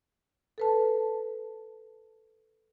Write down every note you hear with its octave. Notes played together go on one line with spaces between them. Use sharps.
A4 B4 A5